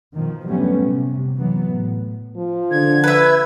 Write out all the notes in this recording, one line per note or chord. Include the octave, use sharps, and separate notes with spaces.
B2 D#3 F3
D3 F#3 G3 A3 B3 C#4
C3
E3 F#3 B3
A2
F3
D3 G#6
B4 E5